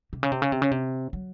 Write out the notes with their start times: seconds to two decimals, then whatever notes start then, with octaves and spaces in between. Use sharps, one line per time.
0.13 C3
0.23 C#3
0.32 C3
0.42 C#3
0.52 C3
0.62 C#3
0.71 C3
1.13 F#3